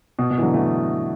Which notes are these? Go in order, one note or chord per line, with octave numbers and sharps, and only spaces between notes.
B2
B2
E3
D3 F#3
E3 A3